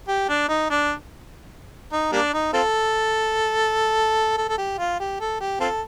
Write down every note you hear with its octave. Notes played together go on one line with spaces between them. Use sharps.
G4
D4
D#4
D4
D#4
G3 A#3 D4
D#4
C4 F4 A4
A4
A4
G4
F4
G4
A4
G4
C4 F4 A4